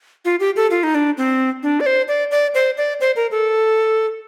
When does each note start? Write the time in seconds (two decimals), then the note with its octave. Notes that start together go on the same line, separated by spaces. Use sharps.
0.25 F4
0.40 G4
0.56 A4
0.71 F4
0.83 D#4
0.95 D4
1.18 C4
1.63 D4
1.80 D5
1.86 C5
2.08 D5
2.31 D5
2.54 C5
2.77 D5
3.01 C5
3.16 A#4
3.31 A4